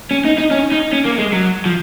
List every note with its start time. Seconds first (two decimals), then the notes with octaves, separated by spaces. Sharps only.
0.11 C#4
0.25 D#4
0.38 D#4
0.51 C#4
0.72 D#4
0.92 C#4
1.05 A#3
1.18 G#3
1.32 F#3
1.66 F3